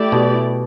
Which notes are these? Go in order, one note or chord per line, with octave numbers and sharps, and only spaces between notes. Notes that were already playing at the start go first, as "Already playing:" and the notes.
Already playing: A3 E4 G4 D5
B2